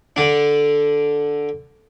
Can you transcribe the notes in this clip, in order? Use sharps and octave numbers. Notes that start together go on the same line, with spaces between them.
D3 D4